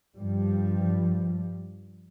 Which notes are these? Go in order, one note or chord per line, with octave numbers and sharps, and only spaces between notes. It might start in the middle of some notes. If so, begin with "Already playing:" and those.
G2 F3 G3